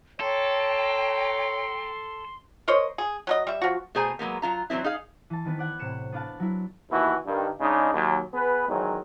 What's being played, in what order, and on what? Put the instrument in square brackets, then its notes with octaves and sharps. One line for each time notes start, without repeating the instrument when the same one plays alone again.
[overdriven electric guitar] A4 [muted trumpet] C#5 [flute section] G5 A#5 [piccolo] C6
[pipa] A#4 C5 C#5 D#5
G#4
F#3 A#4 D#5
G3 E5
F3 F#4
[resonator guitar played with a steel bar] B2 A3 G#4 C5 G#5 A#5
F#3 G#3 A#3 B3
F#3 F4 A#5
E3 F#3 A#3 C4 E4
D#4 G#4 F5
[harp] E3 A5
D#3 B3 B4
D5 F#5 G#6
A2 C3 C#7 E7
B3 D4 F5 A5
F#3 E4
[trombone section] D#2 B2 E3 E4 F#4
G2 D#3
C#3 G#3 D4 D#4
D#2 F#3
B3 G#4 B4
E2 G#2 D#3 F#3